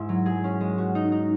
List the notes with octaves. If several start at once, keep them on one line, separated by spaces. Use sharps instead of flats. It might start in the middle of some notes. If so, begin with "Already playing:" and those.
Already playing: G#2 E4
F#3
G#4
C#4
G#3
F#4
D#4
D#4